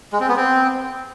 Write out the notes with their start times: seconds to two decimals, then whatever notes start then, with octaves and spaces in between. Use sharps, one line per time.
0.13 G#3
0.21 C4
0.29 B3
0.36 C4